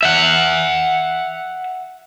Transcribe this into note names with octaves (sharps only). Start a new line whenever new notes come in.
E5 F#5